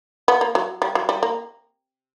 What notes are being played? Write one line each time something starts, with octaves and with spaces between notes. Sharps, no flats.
B3
A#3
F#3
G3
F#3
G3
A#3